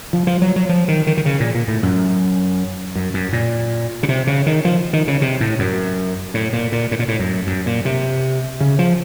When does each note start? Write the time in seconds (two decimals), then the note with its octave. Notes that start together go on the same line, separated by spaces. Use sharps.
0.13 F3
0.27 F3
0.42 F#3
0.56 F#3
0.69 F3
0.88 D#3
1.07 D#3
1.17 D#3
1.25 C#3
1.40 A#2
1.55 A#2
1.68 A2
1.83 F#2
2.96 F#2
3.14 F#2
3.33 A#2
4.03 C#3
4.08 C3
4.27 C#3
4.46 D#3
4.65 F3
4.93 D#3
5.08 C#3
5.22 C3
5.41 A2
5.59 F#2
6.34 A2
6.53 A#2
6.72 A#2
6.91 A2
6.99 A#2
7.08 A2
7.19 F#2
7.47 F#2
7.66 A#2
7.85 C3
8.60 C#3
8.79 F3